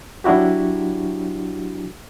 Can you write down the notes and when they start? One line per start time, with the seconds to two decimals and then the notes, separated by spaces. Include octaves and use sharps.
0.24 F#3 D4 E4 F#4 G4